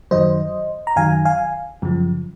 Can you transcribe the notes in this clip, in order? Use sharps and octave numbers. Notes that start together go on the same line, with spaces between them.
F#2 D#3 F#3 C5 D#5
A#5
F#2 D#3 F#3 F5 G#5
F5 G#5
F#2 C#3 F3